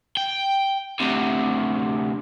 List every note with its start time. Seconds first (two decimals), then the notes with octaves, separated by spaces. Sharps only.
0.17 G5
1.00 D2 C3